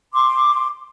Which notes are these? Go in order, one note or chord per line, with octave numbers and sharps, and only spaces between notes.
C6 D6